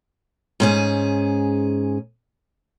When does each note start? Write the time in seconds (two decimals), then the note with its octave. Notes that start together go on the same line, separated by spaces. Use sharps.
0.60 G#2 C#4 G#4